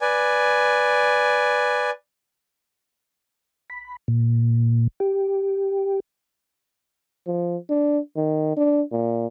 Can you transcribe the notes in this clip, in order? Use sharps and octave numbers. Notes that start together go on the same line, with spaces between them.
B4 D5 G#5
B5
A#2
G4
F3
D4
D#3
D4
A#2